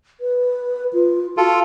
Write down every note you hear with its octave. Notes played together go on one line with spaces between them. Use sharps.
B4
F4
F4 F#4 A4